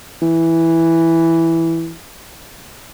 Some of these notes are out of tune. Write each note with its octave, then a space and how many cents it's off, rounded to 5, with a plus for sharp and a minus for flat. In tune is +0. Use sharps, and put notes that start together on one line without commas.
E3 +0